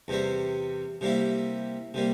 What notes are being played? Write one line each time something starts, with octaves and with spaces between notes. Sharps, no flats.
E2 C3 G3 C4
C3 G3 A#3 E4
C3 G3 A#3